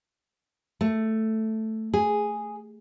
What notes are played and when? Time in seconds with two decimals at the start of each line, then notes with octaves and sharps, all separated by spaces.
0.81 A3
1.94 G#4